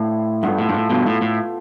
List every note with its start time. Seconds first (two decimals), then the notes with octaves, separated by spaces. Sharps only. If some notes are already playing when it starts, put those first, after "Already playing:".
Already playing: A2 D4 G4 C5 F5
0.43 G2 B3 F4 A4
0.58 A2
0.69 G2
0.74 A2
0.90 G2 B2
1.07 A2
1.22 A2